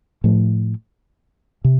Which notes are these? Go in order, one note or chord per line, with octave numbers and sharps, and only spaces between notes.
A2 F3 A3
C3